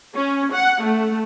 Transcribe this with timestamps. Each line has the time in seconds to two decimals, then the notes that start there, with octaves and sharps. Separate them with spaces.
0.14 C#4
0.53 F#5
0.82 A3